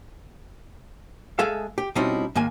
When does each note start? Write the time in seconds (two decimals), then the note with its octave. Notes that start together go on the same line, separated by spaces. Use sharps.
1.39 G#3 G#4 A4 E5 F5
1.78 G4
1.95 B2 G3 C4 C#4 D#4 E4
2.35 G#2 D#3 A#3 G#5